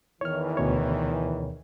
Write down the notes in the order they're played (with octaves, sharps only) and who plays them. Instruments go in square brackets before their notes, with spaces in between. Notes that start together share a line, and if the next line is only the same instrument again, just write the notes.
[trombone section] E2 D#3 E3 [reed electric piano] C#5 F6
[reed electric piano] D2 B2 C#5